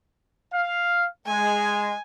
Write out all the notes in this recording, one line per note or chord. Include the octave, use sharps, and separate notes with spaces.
F5
G#3 G#5